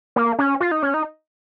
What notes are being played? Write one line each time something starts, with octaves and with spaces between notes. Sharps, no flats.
A#3
C#4
F4
D#4
C#4
D#4